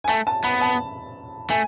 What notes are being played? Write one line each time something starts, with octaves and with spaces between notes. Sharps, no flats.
G#5
A3 A5
A5
B3 B5
A5
A3 G#5